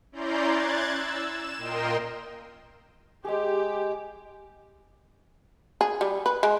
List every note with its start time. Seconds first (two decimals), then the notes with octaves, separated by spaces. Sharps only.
0.12 C#4 E4 D5 A#5 C6 G6
0.46 F#6 G#6 A6
0.91 E6
1.26 E7
1.57 A#2 A#4 D#5 G5 C6
3.25 G#3 G4 G#4
5.81 G#4
6.01 G3
6.26 B4
6.43 G#3